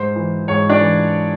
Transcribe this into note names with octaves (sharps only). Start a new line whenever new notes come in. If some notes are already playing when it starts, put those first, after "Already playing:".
Already playing: G#2 C5
E3
G#2 C#5
D4 D5
E3